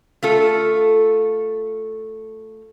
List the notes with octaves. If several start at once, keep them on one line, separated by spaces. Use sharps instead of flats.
A3 F4 A4